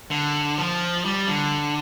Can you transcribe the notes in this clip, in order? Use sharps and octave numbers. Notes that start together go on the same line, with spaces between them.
D3
F3
G3
D3